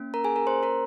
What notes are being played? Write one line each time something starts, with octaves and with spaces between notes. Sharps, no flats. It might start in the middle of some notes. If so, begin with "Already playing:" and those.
Already playing: A#3 C#4
A#4 A#5
G#4 G#5
A#4 A#5
C5 C6
A#4 A#5